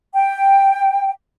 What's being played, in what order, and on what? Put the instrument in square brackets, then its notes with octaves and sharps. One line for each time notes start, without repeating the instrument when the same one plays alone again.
[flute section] G5